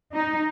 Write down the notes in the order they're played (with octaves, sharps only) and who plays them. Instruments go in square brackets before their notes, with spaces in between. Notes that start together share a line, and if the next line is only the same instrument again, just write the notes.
[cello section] D#4